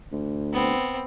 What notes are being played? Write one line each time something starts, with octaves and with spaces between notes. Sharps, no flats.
D2
B3 C4